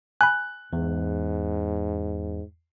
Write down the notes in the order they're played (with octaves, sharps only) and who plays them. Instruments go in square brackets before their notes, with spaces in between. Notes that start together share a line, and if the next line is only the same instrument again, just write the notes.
[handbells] G#5 B5 [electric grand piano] F#6
[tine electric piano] E2 [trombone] G#2